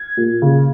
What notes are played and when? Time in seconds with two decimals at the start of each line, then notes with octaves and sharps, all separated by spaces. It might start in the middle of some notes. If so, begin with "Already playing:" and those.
Already playing: G#6
0.17 A#2
0.42 C#3